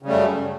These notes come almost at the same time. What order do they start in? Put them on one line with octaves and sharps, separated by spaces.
C#3 G3 A3 F#2